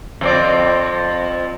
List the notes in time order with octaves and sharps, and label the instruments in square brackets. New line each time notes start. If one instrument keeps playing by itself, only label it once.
[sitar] F2 C4 D5